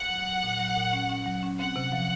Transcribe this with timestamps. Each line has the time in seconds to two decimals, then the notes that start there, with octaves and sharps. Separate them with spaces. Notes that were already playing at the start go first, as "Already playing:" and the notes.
Already playing: F#5
0.10 F#3
0.27 F#3
0.43 A#2
0.59 F#3
0.76 A#2
0.93 C#4
1.09 C#4
1.26 F#3
1.43 C#4
1.59 C4 F#5
1.76 C3
1.92 F3